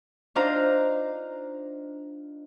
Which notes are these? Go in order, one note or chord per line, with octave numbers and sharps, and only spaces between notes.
D4 D#4 F4 C5 F5 A#5